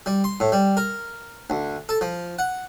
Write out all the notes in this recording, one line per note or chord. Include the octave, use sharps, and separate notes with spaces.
G3
C6
A2
G3
A#4
D2
A4
F3
F#5